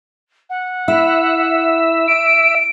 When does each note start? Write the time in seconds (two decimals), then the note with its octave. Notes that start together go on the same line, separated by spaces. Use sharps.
0.49 F#5
0.88 E4 E5
2.07 D7